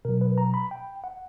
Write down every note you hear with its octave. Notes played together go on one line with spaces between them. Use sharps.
B2 F#3 A#4
B4
A#5
B5
G5
F#5